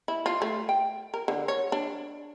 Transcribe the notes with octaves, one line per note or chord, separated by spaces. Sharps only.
E4
F4
A3
G5
A#4
D3
C#5
D4